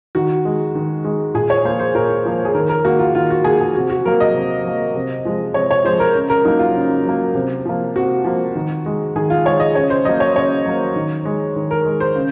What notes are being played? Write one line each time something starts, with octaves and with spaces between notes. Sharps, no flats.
D#3 F#4
G#3
D#3
G#3
A#2 G#4
C#5
F3 A#3 C5
C5
A#2 A#4
F3 A#3
G#4
D#3 A#4
A#4
A#3 F#4
F4
D#3 F4
F#4
A#3 G#4
G#4
C3 F#4
F#4
F#3 A#3 A#4
D#5
C3
F#3 A#3
C3
F3 G#3
C3 C#5
C#5
F3 G#3 C5
A#4
C#3
A#4
F#3 A#3 D#4
F4
C#3
F#3 A#3
C3
F3 A#3
C3 F#4
F3 A#3
D#3
G#3
D#3 G#4
F4
G#3 C#5
D#5
C#3 C#5
C5
F#3 A#3 D#5
C#5
C#3 C#5
F#3 A#3
D#3
G#3
D#3
A#4
G#3
C5
C#3